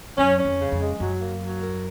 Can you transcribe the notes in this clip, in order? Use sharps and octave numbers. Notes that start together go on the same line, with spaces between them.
F#2 C#4
C#4
F2
C#3
F2
G#3
F#2 F#3
A#3
F#3
A#4